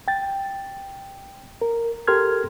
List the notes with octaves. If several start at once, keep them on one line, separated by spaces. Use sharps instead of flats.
G5 A6
A#4
G4 A4 A#4 C6 F6 G#6